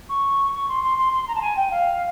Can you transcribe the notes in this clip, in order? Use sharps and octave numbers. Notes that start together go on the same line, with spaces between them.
C#6
C#6
C6
C6
C6
C6
A#5
A5
G#5
G5
F5